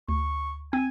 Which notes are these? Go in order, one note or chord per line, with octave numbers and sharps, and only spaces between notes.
D2 C#6
C4 G#5